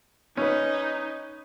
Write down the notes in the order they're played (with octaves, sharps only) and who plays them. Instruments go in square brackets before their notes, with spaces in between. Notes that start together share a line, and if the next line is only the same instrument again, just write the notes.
[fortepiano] C#4 B4 [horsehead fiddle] D#4